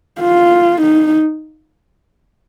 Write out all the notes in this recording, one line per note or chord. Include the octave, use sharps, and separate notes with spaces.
F4
D#4